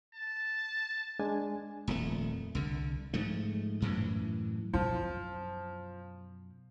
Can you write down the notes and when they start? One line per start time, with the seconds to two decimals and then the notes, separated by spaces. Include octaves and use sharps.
0.15 A5
1.19 G#3 D4 G#5
1.87 D#1 F2 F#3 A3
2.55 C2 D3
3.14 G#2 F3 A3
3.82 F#2 A2 E3
4.73 F#2 B2 F3